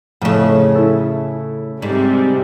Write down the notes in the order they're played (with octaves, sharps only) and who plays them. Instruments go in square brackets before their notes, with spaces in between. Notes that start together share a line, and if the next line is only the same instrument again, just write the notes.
[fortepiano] F2 A3 [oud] A2 C#3
[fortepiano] E4 A4
[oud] G#2 [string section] C3 G3